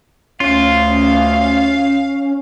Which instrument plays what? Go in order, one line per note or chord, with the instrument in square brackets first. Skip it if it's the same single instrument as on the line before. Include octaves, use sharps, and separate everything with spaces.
[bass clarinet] D2 [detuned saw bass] C#4 [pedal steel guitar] F4 [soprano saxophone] F5